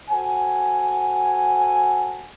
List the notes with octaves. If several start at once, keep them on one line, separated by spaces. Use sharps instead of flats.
F#4 A4 C5 F#5 G#5